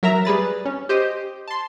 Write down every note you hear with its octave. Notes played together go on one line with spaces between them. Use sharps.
F#3 A#4 E5 A#5
G3 G#4 B4 A6
C#4
G4 C5 D#5
A5 C6